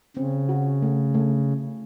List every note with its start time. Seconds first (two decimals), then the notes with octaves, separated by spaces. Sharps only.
0.17 C#3 C4
0.49 F#4
0.82 A3
1.14 A3